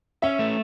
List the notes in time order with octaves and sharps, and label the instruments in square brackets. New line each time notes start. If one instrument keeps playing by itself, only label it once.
[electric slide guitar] C#4 [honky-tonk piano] E5
[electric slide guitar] A3